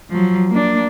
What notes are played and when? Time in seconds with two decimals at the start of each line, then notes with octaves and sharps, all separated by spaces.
0.11 F3 F#3
0.50 A#3 D4